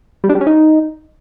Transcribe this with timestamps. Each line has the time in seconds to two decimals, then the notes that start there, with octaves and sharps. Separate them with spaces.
0.24 G3
0.29 D4
0.35 G3
0.41 C#4
0.47 D#4